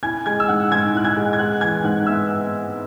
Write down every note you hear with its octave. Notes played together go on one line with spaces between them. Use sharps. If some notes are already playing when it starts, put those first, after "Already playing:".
E4 G#5 G#6
G#3 G#5 G#6
E6
G#2 F#5 F#6
G#2 G#5 G#6
E4 F#6
G#5 G#6
G#3
G#6
G#3 F#5 F#6
E3 G#5 G#6
G#2 F#5 F#6
B3 E5 E6